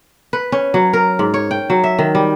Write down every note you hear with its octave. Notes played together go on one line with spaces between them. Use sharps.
B4
C#4
F#3
A#4
G#2
C#5
G5
F#3
E5
D#3
G3